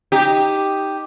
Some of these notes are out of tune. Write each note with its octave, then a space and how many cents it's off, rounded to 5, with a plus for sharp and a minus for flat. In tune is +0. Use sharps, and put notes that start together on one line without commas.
D#4 +0 G4 +0